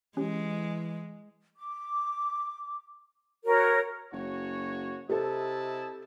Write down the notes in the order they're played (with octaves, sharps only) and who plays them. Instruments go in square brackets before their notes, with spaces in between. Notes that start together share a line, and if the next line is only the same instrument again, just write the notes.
[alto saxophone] E3 [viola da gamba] G#3 [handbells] C#4 G4
[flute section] D6
F#4 A#4 C#5
[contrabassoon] F#1 [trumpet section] F#4 C#5
[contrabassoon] C3 [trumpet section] E4 D#5 A5 [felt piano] G4 A4